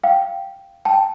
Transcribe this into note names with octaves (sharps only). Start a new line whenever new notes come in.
F5 G5
G5 A5